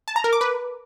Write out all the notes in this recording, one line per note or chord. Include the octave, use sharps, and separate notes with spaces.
A5
A#5
A#4
D6
B4